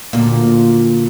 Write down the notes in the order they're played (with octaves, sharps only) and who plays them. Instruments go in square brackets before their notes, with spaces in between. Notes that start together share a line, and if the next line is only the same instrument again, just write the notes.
[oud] D2 A#2